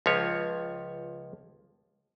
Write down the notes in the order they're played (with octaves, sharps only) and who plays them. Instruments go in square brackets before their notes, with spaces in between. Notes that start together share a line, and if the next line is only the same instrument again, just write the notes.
[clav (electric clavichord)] C#2 F3 C#5